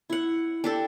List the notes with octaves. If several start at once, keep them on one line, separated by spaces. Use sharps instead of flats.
E4 F#5
D4 G4 A4